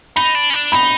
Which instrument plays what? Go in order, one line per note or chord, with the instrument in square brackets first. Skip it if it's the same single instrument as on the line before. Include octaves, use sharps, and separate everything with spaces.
[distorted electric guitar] D#4 [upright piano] B5
[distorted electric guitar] D4
C#4
D4
[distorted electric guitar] D#4 [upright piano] B5